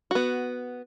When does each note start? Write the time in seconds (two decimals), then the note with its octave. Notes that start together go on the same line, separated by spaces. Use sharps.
0.11 B3 F#4